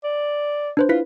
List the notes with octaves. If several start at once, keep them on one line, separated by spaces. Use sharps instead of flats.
D5
D4 B4 C5
E4 F4 B4 B6